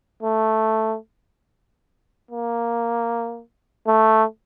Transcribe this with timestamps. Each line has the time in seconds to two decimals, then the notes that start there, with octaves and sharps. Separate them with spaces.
0.23 A3
2.31 A#3
3.87 A3